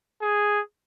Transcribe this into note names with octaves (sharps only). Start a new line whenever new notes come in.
G#4